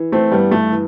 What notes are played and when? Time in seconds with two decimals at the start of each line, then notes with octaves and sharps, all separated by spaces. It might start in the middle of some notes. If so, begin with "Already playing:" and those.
Already playing: E3
0.12 A3 C4
0.32 G2 G3 B3
0.52 A3
0.71 E3